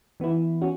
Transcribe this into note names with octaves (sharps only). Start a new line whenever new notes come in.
E3 B3 E4
C#4 F#4